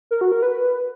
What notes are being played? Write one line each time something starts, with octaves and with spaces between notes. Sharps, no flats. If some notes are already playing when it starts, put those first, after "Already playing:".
A#4
F#4
A#4
B4